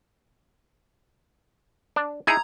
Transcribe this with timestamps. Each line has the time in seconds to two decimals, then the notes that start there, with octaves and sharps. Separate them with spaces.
1.96 D4
2.27 D#4 E4 G#4 A#5 G#6